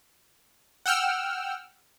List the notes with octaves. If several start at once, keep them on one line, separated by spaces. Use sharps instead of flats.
F#5 G5 E6 F6